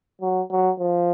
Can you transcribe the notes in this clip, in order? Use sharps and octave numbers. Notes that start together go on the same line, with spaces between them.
F#3
F#3
F3